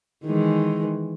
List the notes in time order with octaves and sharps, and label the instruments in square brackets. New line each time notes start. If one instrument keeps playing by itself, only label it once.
[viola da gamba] D#3 E3 G#3